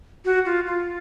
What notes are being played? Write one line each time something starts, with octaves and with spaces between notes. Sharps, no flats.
F#4
F4
F4